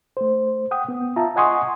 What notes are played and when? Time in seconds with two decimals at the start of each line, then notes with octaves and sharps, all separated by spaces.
0.17 A3 C5
0.71 F#5 G5 D#6
0.89 B3
1.16 F4 E5 A5 A#5
1.36 D#5 F#5 G#5 C6 C#6 D#6